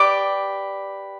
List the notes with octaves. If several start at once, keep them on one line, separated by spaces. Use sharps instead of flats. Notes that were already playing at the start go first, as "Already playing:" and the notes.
Already playing: G4 B4 D5 D6